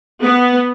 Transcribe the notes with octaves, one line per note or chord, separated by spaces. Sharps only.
B3